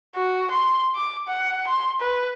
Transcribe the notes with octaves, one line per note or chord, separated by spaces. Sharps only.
F#4
C6
D6
F#5
C6
B4